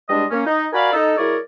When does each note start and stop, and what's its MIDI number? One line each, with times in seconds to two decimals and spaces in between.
0.09 0.24 40
0.09 0.24 55
0.09 0.24 56
0.09 0.24 62
0.09 0.24 75
0.31 0.45 58
0.31 0.45 61
0.46 0.66 63
0.73 0.90 66
0.73 0.90 70
0.73 0.90 74
0.73 0.90 77
0.73 0.90 80
0.73 0.90 83
0.93 1.17 63
0.93 1.17 69
1.17 1.37 54
1.17 1.37 64
1.17 1.37 68
1.17 1.37 70
1.17 1.37 73
1.17 1.37 74